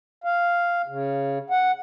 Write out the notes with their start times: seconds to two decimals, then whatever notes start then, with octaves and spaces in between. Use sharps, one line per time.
0.24 F5
0.88 C#3
1.50 F#5